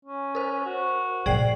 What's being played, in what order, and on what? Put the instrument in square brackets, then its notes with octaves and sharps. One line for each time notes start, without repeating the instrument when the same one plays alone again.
[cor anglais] C#4
[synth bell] A#4 C5
[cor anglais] F#4
[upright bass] A#2 F3 [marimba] G#4 D5 G5 [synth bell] C7 F#7